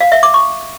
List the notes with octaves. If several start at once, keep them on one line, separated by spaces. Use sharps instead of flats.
F5
E5
D6
C#6